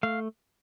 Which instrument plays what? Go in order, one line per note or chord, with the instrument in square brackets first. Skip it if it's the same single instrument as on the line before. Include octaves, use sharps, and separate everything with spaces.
[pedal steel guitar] A3 F5